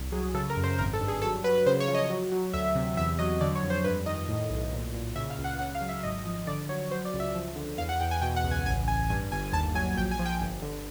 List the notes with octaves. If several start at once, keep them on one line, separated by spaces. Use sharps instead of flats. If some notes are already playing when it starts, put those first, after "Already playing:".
Already playing: C2
F#3 G#4
C#3 A4
A#4
F#2
C5
G#1 A#4
A4
G2
G#4
F#3 A4
F#3 B4
C#3 C5
C#5
F3
D#5
F#3
F#3
D2 E5
C3
E2 E5
F#3 D#5
D3 D5
C#5
F2
C5
G2 B4
D#3 D#5
A2
B1
A#2
A#2
C#3 E5
F5
C#2
F#5
C#3 F#5
F5
F#3
E5
G#1 D#5
F3
D3 D5
F#3 C#5
F#3 C5
D5
C#2
E5
F3
D3
E2 F5
F#5
E2 G5
G#5
B2 G5
F#5
C#2
G#5
A1 G#5
A1 G#5
G2 G#5
G1 G#5
D#2 A5
F#3 G#5
A#1 G5
G#5
F3
G5
G1
D3